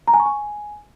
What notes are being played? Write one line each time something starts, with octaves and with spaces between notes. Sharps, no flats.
A#5
G#5
C#6
G#5